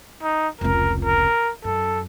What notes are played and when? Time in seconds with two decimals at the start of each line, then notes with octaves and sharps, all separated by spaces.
0.23 D#4
0.61 F1 C#2 A#4
1.04 A#4
1.64 F#2 A4